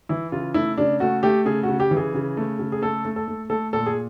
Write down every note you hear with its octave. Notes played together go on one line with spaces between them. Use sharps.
E3 E4
C#3 F4
A3 E4
C#3 D4
A3 F#4
A3 G4
C#3 G#4
F#4
C#3
G4
E3
G#4
C#3
A3
C#3
G#4
A3 A4
A3
A4
A3
A3 A4
A#2 A4
G#4